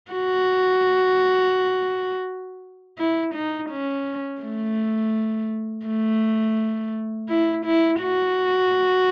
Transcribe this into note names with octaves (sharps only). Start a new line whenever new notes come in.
F#4
E4
D#4
C#4
A3
A3
E4
E4
F#4